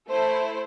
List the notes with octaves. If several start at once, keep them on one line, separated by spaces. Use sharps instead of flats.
A3 E4 A4 C5